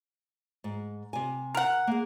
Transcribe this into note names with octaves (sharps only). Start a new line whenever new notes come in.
G#2
C3 G#5
A#4 F#5
A#3 G#4